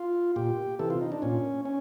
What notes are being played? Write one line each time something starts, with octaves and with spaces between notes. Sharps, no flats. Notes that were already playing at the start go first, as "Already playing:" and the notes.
Already playing: F4
A#2 G4
C3 E3 A4
F4
D#4
D4
A#2 C#4
C#4